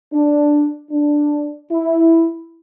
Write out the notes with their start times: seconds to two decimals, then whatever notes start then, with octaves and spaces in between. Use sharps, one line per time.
0.13 D4
0.91 D4
1.71 E4